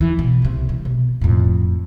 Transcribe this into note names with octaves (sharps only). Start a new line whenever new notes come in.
D#2 E3
B2
C2 C3
G3
B2
F2 A2